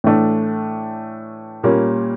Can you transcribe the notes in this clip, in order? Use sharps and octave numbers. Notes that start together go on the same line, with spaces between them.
A2 E3 A3 D4
A#2 G3 A#3 C#4